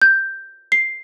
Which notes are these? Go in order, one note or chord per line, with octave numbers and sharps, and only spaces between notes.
G6
C7